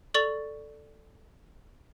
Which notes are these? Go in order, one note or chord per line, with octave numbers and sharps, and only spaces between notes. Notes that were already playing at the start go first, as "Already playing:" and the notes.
A4 D5 C#6 A6 F7 F#7